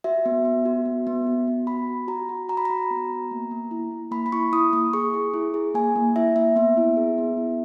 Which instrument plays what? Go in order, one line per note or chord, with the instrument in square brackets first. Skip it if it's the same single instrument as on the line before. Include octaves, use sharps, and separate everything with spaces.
[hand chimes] F#4 E5
B3
B3
F#4
B3
B3
F#4
B3
F#4 B5
F#4
F#4 A#5
F#4
F#4 A#5
B5
F#4 A#5
B3
B3
A#3
A#3
E4
E4
A#3 B5
B5
E4 C#6
E4 D#6
A#3 D#6
G#4 C#6
G#4
E4
G#4
A#3 G#5
A#3
E4 E5
A#3 E5
B3 E5
E4
G#4
B3
E4